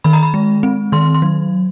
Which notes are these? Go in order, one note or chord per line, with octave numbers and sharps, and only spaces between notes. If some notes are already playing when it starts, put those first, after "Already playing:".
D#3 B5
A#5
B5
G#3
C4
D#3 C6
C6
F#3